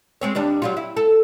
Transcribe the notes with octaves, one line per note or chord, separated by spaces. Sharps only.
G#3 C4 C#5
D#2 G3 D4
F#3 G3 F4
E4
A4